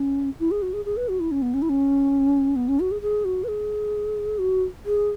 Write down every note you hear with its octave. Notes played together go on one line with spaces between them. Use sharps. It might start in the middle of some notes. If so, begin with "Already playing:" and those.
Already playing: C#4
E4
G#4
F#4
G#4
G#4
B4
F#4
E4
C#4
B3
C#4
E4
C#4
B3
C#4
F#4
G#4
G#4
F#4
B4
G#4
F#4
G#4